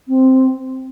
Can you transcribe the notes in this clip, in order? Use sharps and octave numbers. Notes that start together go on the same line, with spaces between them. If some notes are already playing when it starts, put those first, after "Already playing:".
C4